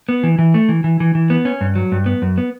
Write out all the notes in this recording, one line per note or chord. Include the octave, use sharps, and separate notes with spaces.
B3
E3
E3
A3
E3
E3
E3
E3
B3
C#4
G2
F#3
G2
B3
F#2
B3